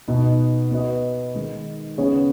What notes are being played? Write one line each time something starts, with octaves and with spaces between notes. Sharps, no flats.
B2 B3 D#4
B3 F#4 B4 D#5
D#3 G#3 D#4
C#3 B3 G#4 C#5